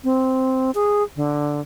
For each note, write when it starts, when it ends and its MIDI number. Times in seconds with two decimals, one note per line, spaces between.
0.04 0.71 60
0.75 1.03 68
1.16 1.61 50